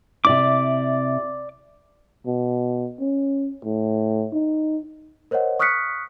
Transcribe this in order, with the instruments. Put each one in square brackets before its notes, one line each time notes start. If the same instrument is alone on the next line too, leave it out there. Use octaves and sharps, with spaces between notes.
[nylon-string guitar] C3 E4 [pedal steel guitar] D5 D6
[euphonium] B2
C#4
A2
D#4
[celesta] A#4 C5 C#5 D#5 F#5
C#6 D#6 F6 F#6 B6 C#7